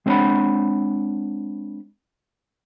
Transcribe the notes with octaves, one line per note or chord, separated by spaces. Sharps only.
G#3 C4 D4 C#5 F#5 B5